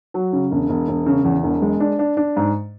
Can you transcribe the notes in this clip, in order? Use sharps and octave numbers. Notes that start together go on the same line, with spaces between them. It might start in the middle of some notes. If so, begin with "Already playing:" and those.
F#3
C#3
E1
E1
E1
C#3
E2
E1
G#3
D4
D4
D4
G#2